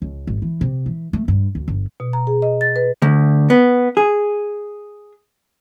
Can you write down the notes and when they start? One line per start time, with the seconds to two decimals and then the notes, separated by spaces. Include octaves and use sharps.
0.02 C#2
0.27 G#1
0.42 E3
0.61 C3
0.86 E3
1.13 A3
1.28 G2
1.55 D2
1.68 G1
2.00 B2
2.13 A#5
2.27 G#4
2.42 D#5
2.61 A6
2.76 B4
3.02 D2
3.50 B3
3.97 G#4